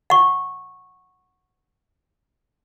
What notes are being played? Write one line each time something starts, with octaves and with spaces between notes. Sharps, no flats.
F#5 C#6